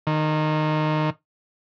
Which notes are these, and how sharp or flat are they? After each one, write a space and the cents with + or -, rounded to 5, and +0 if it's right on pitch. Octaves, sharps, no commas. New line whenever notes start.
D#3 -15